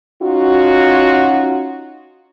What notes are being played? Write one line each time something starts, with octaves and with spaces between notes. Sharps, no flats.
C#4 D#4 F4 F#4